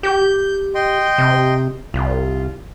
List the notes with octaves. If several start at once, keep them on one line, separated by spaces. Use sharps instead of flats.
G4 G6
D#5 G5 C6
C3
C2 F4